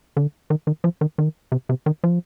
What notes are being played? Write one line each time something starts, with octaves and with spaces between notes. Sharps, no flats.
D3
D#3
D#3
F3
D#3
D#3
C3
C3
D#3
F3